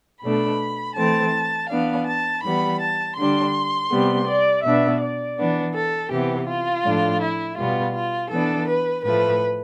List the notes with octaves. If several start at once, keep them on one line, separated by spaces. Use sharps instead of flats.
B2 A3 D4 B5
E3 A3 C4 A5
E3 B3 D4 F5
A5
E3 G3 B3 B5
A5
D3 G3 D4 C6
C3 G3 B3
D5
B2 B3 D4 E5
D5
E3 B3 D4
A4
C3 E3 B3 G4
F4
A2 F3 A3 D4
E4
B2 G3 B3 F4
F4
E3 B3 D4 A4
B4
A2 F3 A3 B4